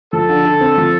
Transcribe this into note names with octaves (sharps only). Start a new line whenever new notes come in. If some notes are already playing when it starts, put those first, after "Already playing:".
F3 A4
D3
D3
C4
F3